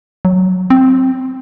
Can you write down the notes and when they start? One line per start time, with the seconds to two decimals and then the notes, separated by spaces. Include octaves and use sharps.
0.25 F#3
0.70 C4